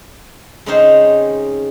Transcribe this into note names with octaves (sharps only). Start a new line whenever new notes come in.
C#3 G#3 C4 C#4 D#4 C5